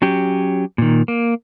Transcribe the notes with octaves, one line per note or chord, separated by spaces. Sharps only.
F#3 C#4 G4
A#2 D#3
A#3